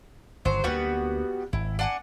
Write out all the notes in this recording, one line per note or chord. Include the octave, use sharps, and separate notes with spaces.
G1 G2 D#3 F#3 C5
D2 G3 A#3 B3 F#4
G#1 E4
D4 F#5 G#5